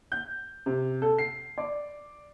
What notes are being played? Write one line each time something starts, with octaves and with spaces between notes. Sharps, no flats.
G6
C3
A4
C7
D5